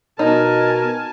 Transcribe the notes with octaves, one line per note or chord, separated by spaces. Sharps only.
B2 D#4 A#4 G#5 A5